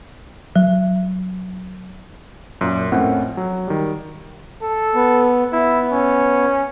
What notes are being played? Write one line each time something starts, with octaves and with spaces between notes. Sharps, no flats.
F#3
F#2 A#2
F2 A2 C4 C#4 A#4 F#5
F#3
D#3 G3
A4
B3
B3 E4
C#4